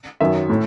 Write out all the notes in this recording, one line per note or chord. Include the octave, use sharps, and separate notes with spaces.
F#2 D#3 F#3 E5
A2